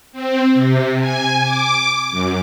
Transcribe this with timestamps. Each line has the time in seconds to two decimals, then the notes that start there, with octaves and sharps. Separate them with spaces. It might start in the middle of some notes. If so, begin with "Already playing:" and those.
0.12 C4
0.54 C3
0.99 G#5
1.43 D6
2.11 F#2